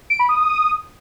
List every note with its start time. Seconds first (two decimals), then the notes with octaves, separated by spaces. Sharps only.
0.10 D7
0.19 B5
0.29 D#6